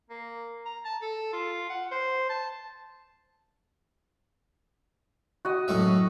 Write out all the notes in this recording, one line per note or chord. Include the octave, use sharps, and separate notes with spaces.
A#3
A#5
A5
A4
F4
F#5
C5
A5
F#4 D#5
F#2 A2 E5